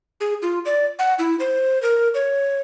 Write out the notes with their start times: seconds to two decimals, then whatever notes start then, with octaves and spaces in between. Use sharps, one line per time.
0.20 G#4
0.42 F4
0.65 D5
0.99 F#5
1.19 E4
1.40 C5
1.82 A#4
2.14 C#5